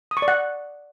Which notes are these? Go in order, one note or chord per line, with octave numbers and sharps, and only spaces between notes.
D#6
C#6
D5
F#5